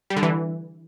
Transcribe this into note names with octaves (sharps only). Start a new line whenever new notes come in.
G3
D3
E3